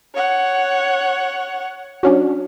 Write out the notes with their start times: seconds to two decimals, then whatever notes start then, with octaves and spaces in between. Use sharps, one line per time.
0.15 C#5 F#5
2.03 F#3 C#4 D4